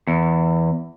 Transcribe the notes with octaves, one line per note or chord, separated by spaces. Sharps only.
E2